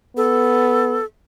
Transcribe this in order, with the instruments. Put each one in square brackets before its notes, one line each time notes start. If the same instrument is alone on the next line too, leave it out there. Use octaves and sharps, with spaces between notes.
[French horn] B3 [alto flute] A4